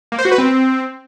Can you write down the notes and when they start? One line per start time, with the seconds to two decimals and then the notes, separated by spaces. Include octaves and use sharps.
0.12 A#3
0.18 C5
0.25 F#4
0.32 B4
0.38 C4